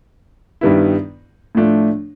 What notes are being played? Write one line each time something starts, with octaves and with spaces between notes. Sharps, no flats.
G2 D#3 G3 B3 E4
A2 F3 A3 D4